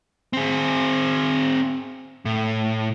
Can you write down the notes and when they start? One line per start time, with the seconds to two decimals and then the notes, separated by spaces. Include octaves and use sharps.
0.33 C4 G#4
2.25 A2